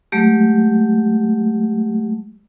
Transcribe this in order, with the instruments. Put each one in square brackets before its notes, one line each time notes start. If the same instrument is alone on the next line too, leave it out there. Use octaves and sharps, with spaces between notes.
[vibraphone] F#3 G#3 A3 G4